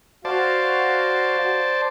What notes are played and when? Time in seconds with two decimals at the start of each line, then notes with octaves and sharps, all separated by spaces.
0.25 F#4 C5 D5 F5 A5